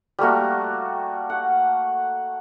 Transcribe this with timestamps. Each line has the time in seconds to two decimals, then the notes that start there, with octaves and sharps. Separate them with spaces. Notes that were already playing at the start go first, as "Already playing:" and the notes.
0.19 G3 A3 A#3 F#4
1.30 F#5